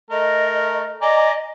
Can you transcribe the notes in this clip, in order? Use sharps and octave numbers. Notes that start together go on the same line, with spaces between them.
A3 A#4 D#5
D5 D#5 G#5 A#5